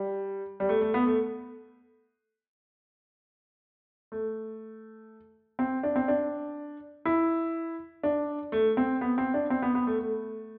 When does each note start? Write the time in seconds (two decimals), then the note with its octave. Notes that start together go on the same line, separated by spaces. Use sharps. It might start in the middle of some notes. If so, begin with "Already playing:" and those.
Already playing: G3
0.60 G3
0.69 A3
0.81 A3
0.94 B3
1.07 A3
4.12 A3
5.59 C4
5.83 D4
5.96 C4
6.08 D4
7.05 E4
8.03 D4
8.52 A3
8.77 C4
9.01 B3
9.18 C4
9.34 D4
9.50 C4
9.62 B3
9.75 B3
9.87 A3
9.99 A3